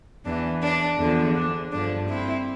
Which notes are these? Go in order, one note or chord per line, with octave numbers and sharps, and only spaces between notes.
E2 E3 D4
D4
E2 D3 F3
D4
G2 D3 F3 D4
C4 E4